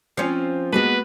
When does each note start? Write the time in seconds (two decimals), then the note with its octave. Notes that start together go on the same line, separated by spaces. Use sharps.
0.17 F3 C4 C#4 F4 C7
0.72 G#3 A#3 B3 F#4 B4 A5